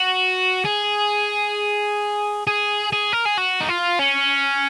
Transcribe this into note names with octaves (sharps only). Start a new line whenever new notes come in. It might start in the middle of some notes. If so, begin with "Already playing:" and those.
Already playing: F#4
G#4
G#4
G#4
A#4
G#4
F#4
D#4
F4
C#4